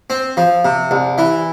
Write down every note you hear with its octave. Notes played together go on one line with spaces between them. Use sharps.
C4
F3
C3
C2
E3